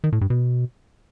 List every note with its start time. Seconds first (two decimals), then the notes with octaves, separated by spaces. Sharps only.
0.04 D#3
0.12 A2
0.21 G2
0.30 B2